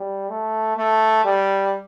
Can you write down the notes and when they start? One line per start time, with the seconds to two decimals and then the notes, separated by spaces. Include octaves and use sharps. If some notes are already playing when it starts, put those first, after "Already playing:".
Already playing: G3
0.30 A3
0.77 A3
1.25 G3